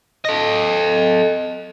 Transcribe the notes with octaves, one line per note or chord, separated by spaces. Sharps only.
A4 D#5